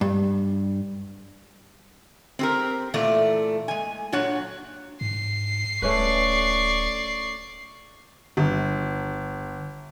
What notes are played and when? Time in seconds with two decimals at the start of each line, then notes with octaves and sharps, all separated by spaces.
0.01 G2
2.39 C4 G4 A#4
2.94 A#2 E3 A3 D5
3.68 G#3 G#5
4.12 A#2 F#3 D4 C#5 F#5
5.01 G#2 C7
5.82 D1 A3 C#4 B4 D5 C#6
8.37 G1